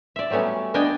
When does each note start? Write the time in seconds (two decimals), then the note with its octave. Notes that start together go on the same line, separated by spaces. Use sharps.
0.16 D5 E5
0.30 F#3 G3 A3 B3 C#4
0.74 B3 D4 D#5 G5 G#5